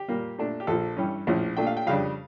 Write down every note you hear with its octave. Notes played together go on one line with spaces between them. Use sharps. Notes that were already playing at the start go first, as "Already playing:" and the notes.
Already playing: G4
A#2 G3 A#3
A#2 A3 D4
G4
A#1 A#2 F3 A4
G2 E3 G3 C#4
A#1 A2 F3 C#4
A#2 A3 D4 G5
F5
G5
F2 C#3 G3 D4 F5